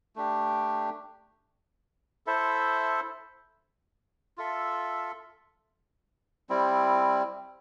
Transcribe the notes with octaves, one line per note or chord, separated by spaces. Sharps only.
A3 D4 G4
E4 A4 C5 E5
F4 A4 E5
G3 C4 E4